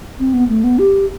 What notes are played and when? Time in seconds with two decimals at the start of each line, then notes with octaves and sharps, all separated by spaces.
0.20 C4
0.34 B3
0.49 A3
0.64 B3
0.79 G4